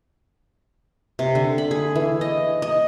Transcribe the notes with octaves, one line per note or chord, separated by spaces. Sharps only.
C3
D3
B5
G#4
E3
D#5
D#5